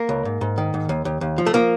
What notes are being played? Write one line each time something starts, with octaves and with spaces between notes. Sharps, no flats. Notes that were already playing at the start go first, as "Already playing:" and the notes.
Already playing: A#3
C#2
G#2
G#2
D#3
G#2
D#2
D#2
D#2
F3
A3
F3 A#3